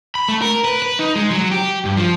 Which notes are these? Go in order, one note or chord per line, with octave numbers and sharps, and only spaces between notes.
B5
A3
A#4
B4
B4
D#4
G#3
F#3
G4
G2
F3